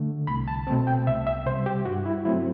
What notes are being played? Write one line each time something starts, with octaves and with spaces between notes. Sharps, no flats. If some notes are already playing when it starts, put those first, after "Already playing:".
Already playing: D3 A3
C2 B5
A5
B2 A3 C4 A5
G5
C2 E5
E5
C3 G3 C5
G4
G2 F#4
E4
F#3 A3 C4 E4